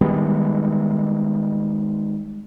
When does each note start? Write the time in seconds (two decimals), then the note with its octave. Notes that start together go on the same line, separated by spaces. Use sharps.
0.01 D#3 G3 G#3 B3